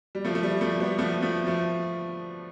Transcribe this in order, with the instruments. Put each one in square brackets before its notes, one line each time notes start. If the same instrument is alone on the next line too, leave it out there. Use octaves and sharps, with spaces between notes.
[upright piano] G3
F3 A3
A3
G3
F3 A3
G3 B3
F3 A3
F3 A3
F3 A3